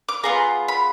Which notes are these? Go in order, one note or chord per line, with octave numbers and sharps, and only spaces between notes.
D6
B3 F4 G#4 A#5
B5